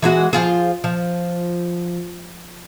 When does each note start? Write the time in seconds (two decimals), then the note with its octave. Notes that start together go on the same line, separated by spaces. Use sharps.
0.02 E3 G#3 F#4
0.33 F3 F4 G#4
0.84 F3